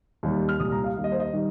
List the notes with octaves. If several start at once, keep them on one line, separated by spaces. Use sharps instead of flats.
D#2 D#3 G3
F6
C2 A#2 G3 D#6
A#5
F5
D#2 D#3 G3 F5
D#5
C5
D#5
D#3 G3